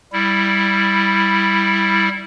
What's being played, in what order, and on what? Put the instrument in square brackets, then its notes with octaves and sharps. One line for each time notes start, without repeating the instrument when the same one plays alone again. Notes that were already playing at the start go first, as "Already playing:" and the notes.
[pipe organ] G3 E4